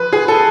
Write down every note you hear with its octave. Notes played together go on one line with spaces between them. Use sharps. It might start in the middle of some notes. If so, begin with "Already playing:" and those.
Already playing: F3 B4
G#4
A4